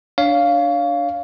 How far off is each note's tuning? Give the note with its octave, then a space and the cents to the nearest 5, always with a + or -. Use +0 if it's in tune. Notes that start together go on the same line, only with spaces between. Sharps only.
D4 -5 C#5 +25 F5 +0